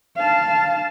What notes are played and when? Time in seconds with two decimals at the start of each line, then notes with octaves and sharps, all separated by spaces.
0.16 F5 A5